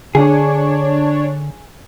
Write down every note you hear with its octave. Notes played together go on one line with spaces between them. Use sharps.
D3 D4 G#4 C#5